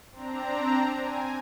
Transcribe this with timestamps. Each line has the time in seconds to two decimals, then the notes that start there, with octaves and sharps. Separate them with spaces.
0.11 C4 D4 A#5
0.97 G#5